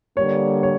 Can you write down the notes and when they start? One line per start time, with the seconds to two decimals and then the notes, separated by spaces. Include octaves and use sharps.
0.17 D3 G3 A#3 C#5
0.63 C#5